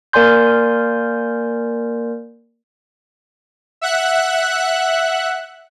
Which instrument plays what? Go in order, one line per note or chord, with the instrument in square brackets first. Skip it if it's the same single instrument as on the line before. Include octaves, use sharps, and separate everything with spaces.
[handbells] A#3 A#4 D5 G#5 C6 G6
[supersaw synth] E5 F#5 F#6